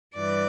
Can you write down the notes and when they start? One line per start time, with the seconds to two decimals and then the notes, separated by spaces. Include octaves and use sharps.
0.14 G2 E3 D5